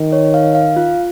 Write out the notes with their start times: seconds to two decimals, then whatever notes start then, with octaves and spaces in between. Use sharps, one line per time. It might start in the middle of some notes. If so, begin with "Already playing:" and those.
Already playing: D#3
0.12 C#5
0.34 F5
0.55 F5
0.76 F4